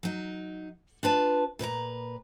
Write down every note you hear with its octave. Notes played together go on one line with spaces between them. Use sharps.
F#3 D#4
D4 F4 B4 A5
A#2 B4 C#5 A#5